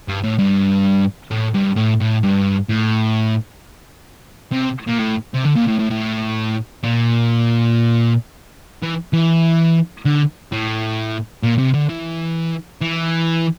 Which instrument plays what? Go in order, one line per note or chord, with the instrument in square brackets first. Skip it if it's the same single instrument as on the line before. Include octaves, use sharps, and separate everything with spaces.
[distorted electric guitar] G2
A2
G2
A2
G2
A2
A2
G2
A2
C3
A#2
A2
C3
D3
A#2
A2
A2
A2
A#2
E3
E3
D3
A2
A#2
C3
D3
E3
E3